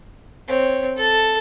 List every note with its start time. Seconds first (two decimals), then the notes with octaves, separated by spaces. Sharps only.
0.48 C4 C#5
0.97 A4